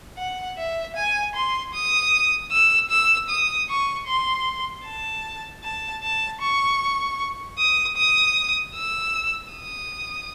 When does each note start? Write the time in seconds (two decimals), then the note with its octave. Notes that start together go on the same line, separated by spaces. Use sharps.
0.18 F#5
0.57 E5
0.96 G#5
1.35 C6
1.74 D#6
2.51 E6
2.90 E6
3.29 D#6
3.69 C#6
4.07 C6
4.85 A5
5.63 A5
6.03 A5
6.41 C#6
7.58 D#6
7.97 D#6
8.75 E6
9.53 D#6